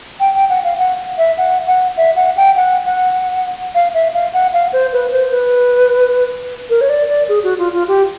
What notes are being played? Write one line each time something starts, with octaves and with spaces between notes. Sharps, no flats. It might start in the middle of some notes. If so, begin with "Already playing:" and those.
G5
G5
F#5
F5
F#5
E5
F#5
F#5
E5
F#5
G5
F#5
F#5
F5
E5
F5
F#5
F5
C5
B4
C5
B4
A#4
C#5
D5
D5
G#4
F#4
F4
F4
G4